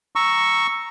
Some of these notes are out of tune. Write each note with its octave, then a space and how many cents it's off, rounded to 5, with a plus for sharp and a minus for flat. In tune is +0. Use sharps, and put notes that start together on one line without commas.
A#5 +0 C#6 +0 E6 +0